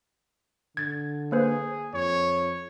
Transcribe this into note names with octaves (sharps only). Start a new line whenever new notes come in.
D3 G#6 A6
A#3 G#4 B4 C5
F2 C#5